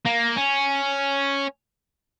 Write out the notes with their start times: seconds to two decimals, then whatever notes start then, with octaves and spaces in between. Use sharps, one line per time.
0.05 A#3
0.36 C#4